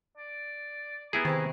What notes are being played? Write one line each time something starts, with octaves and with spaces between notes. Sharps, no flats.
D5
B3 E4 G4 G#4 A#5
C3 D#3 A5 B5